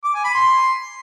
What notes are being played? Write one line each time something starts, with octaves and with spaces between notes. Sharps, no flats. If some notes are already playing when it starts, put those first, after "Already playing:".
D6
G#5
B5
C6